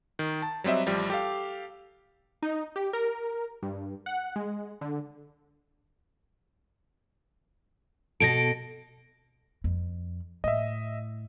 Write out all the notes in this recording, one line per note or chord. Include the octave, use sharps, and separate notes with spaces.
D#3
A5
F#3 G3 C4 D#5 E5
A1 F3 G3
G4 A4 F5
D#4
G4
A#4
G2
F#5
G#3
D3
B2 A4 A#6 D7
F2
A2 D#5 E5